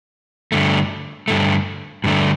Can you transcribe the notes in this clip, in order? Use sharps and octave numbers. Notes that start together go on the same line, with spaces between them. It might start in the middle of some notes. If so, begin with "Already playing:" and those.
G2 D3 A3
G2 D3 A3
G2 D3 A3